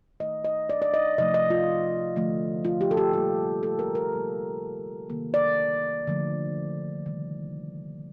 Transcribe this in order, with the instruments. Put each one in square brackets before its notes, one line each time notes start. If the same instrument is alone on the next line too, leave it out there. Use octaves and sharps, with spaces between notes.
[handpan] D#3 A3 D#5
D#5
D5
D5
D#5
C3 F3 A3 D#5
D#5
F4
D3 F3 A3
F4
G4
A4
G4
A#2 G3 A#3 G4
A4
A#4
A#4
C3 G3 A#3
C3 D#3 A#3
D5
D3 F3 A3
C3 D#3 G3